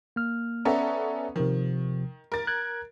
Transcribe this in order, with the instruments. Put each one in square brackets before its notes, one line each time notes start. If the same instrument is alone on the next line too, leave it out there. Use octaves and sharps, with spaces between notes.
[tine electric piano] A#3 F6
[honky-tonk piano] B3 C#4 A4 [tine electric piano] D5 E5 A#5
[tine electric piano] C3 F3 [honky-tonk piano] D#3
[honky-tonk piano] A#4 A6
[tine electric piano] F#6 G#6